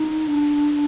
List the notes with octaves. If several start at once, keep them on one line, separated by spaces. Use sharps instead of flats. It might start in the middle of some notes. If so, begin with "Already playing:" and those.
Already playing: D#4
D4